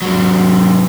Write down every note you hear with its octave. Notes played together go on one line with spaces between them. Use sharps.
G#2 F#3